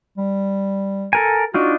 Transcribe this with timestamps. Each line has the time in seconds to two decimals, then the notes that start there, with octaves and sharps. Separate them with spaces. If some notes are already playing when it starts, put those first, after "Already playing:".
0.18 G3
1.13 A4 A#4 G#5
1.54 D4 D#4 F4 F#4